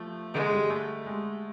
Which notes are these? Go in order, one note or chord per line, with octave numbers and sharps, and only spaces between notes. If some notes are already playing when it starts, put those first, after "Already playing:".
Already playing: F3 A3
D3 G#3
G3
A3
G#3